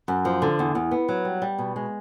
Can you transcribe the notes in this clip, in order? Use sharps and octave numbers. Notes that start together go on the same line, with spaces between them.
F#2
F3
D3
E2
E2
B3
F#3
G3
G3
B2
G#3